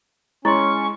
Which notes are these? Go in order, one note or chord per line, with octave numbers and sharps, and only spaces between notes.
G#3 C#4 E4 D#5 C6 C#6